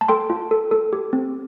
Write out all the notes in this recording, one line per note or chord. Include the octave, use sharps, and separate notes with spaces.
A5
A4 G5 C6
F4
A4
A4
G4
C4